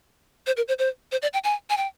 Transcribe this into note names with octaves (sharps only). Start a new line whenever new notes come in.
C5
A#4
C5
C5
C5
D5
G5
G#5
G#5
G5